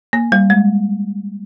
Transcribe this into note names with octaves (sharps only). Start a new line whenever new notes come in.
A#3
G3
G#3